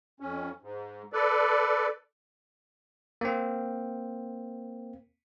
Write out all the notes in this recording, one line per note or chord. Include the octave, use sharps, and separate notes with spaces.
F2 C#4
G#2
A4 B4 D5
A#3 C4